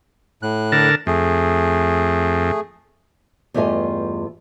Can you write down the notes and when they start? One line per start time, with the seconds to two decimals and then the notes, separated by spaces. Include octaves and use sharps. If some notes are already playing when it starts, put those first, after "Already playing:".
0.43 A2 F#6
0.72 D3 A#4 A5
1.07 F2 A3 G#4
3.54 E2 G2 A3 F4 D#5 G#5